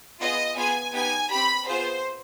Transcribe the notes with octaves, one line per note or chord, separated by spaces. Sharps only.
B3 F4 G#4 D#5
B3 F4 G#4 G#5
B3 D#4 G4 G#5
C4 G4 B5
B3 F4 G#4 C5